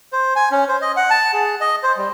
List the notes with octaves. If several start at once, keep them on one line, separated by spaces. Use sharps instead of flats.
C5
G#5
C#4
C5
D#5
F#5
A5
G#4
D#5
C5
G3